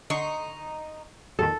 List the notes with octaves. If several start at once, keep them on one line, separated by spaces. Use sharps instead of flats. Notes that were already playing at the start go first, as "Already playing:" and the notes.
D3 D#4 C6 C#6
F2 A#2 D#3 A4